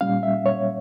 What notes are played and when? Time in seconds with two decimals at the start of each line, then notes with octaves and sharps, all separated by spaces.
0.01 A#2 G3 C#4 F5
0.23 E5
0.46 C#5